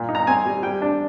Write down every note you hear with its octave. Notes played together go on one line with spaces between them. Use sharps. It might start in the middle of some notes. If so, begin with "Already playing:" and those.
Already playing: A#2
D#4
A#5
C4 G#5
G3
G3 G5
D4